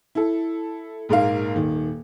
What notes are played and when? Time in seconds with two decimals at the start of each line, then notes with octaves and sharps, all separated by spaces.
0.15 E4 A4
1.09 A#1 G#2 A#3 F5
1.55 D#1 D#3